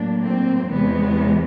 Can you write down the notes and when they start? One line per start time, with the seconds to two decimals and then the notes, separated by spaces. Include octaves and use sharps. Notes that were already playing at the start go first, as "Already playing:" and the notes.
Already playing: A2 F#3 A#3 D4
0.25 C4
0.70 E2 C3 E3 G#3 B3